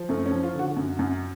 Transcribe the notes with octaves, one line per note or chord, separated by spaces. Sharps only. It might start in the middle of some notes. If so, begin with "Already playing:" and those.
Already playing: F3
F#2 A3
C#4
F3
F4
D3 F#4
F#2
F#2